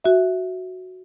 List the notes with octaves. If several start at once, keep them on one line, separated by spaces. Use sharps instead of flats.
F#4 E5